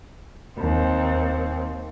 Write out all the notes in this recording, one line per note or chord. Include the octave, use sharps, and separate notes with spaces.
D#2 C4